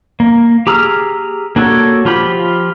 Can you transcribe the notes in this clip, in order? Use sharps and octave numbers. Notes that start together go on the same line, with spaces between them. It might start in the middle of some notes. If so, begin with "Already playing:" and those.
A#3
G4 G#4 A#5 E6 F6
A#3 D4 F#4 A4 C#5
F3 F4 G4 B5